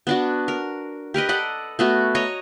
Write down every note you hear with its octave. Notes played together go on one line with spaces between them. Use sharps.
B3 D4 F#4
A#4
G4 A#4 B4 D#5
A4 D5 D#5 F#5
A3 B3 F#4
C#5 D#5 A#5